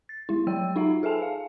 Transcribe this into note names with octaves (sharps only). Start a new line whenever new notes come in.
A6
G#3 E4
F#3 C#5 G5 E6
D#4 F4 E5 F#5 A#5
G#4 A4 E5 G#5 A5
F5